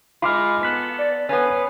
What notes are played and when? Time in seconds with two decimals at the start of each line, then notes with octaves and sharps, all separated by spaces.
0.22 G#3 D#4 F4 B5 D6 F6
0.63 B3 A4 F#6 B6
0.98 D5
1.29 B3 C#4 B4 F5